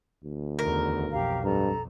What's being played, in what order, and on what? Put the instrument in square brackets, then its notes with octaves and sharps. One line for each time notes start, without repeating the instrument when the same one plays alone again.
[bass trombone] D2
[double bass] E2 D#3 [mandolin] A#4
[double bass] B1 F2 [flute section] G4 F5 A#5
[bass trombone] G2 [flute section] A4 A#5